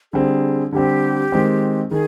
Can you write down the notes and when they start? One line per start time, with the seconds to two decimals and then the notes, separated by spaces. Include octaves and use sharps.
0.13 D3 G3 C4 G#4
0.72 D3 G3 C4 G4
1.32 D#3 G#3 C4
1.91 D#3 G#4